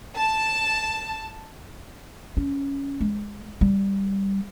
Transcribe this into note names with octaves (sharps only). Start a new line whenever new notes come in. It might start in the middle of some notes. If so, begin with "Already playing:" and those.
A5
C#4
G#3
G3